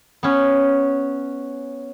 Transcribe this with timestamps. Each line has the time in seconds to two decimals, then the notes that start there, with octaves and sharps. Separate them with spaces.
0.23 B3 C#4